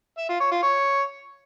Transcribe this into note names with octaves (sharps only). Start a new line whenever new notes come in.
E5
F4
C#5
F4
C#5